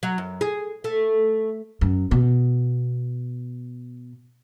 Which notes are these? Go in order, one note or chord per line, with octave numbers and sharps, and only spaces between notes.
F#3
F#2
G#4
A3
F#2
B2